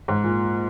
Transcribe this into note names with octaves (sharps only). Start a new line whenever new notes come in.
G#2
A#2